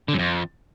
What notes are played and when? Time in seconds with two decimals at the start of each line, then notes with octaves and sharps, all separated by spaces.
0.08 D3
0.14 F#2
0.19 F2